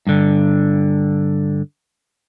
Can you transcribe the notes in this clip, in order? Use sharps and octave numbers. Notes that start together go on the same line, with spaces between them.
G2 D3